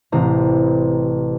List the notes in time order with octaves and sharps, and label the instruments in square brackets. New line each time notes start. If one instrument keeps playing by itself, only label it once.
[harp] A1 C3 C5 A#5